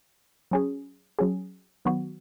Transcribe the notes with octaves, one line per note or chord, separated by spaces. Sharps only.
F#3 C#4 G#4
F#3 C#4 G#4
D#3 F#3 B3 F#4